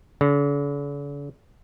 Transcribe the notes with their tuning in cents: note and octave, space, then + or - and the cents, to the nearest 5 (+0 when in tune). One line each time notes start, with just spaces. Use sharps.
D3 -45